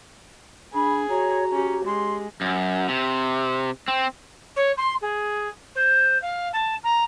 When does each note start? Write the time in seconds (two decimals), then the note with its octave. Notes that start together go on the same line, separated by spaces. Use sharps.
0.74 D4 G#4 B5
1.09 F#4 C#5 A#5
1.52 C#4 G4
1.85 G#3 C6
2.41 F#2
2.89 C3
3.88 C4
4.56 C#5
4.77 C6
5.01 G#4
5.75 C5
6.21 F5
6.53 A5
6.83 A#5